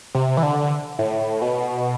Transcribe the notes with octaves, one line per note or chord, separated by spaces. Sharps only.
C3
E3
D3
A2
B2